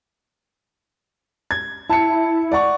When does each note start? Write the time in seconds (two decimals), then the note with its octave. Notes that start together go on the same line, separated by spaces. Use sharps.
1.51 G#6
1.90 E4 A5 C#7
2.52 D5 F#5 C#6